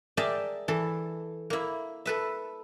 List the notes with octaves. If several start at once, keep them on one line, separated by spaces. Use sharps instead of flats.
G#4 A#4 D5 E5 G5 A5
E3 A4
A#3 E4
A4 B4 E5